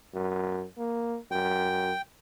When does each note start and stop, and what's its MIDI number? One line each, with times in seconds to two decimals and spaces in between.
0.14 0.63 42
0.78 1.17 58
1.31 1.91 42
1.31 2.02 79